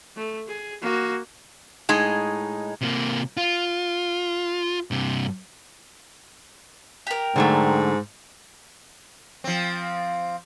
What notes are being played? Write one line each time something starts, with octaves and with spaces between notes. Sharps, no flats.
A3
G#4
A#3 F#4
A2 G#3 D#4
C3 A#3
F4
G2 C3
G4 A#4
G#2 D3 F#3 A3
F3 C4